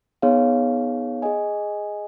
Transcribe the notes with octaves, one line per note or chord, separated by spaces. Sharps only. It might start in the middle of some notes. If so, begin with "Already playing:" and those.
B3 D#4 G#4 C#5 F5
G#4 D#5 G#5